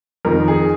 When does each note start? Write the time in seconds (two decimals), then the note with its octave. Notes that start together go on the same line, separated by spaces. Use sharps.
0.25 F2 D#3 A#4
0.48 G#4